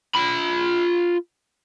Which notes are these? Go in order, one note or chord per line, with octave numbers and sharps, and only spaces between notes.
F4 B5